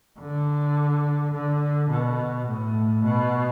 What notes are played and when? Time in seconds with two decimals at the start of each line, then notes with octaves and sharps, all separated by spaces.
0.19 D3
1.33 D3
1.90 B2
2.47 A2
3.04 B2